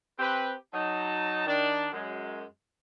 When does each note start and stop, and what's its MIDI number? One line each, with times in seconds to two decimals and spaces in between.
0.19 0.54 60
0.19 0.54 67
0.19 0.54 71
0.74 1.45 54
0.74 1.45 63
0.74 1.45 81
1.46 1.89 51
1.46 1.89 62
1.92 2.45 42
1.92 2.45 56